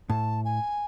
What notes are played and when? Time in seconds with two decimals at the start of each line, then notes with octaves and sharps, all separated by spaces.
0.09 A2 A5
0.45 G#5